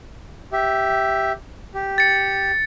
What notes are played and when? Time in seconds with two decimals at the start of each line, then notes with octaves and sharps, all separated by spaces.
0.52 G4 E5
1.74 G4
1.98 A6 C#7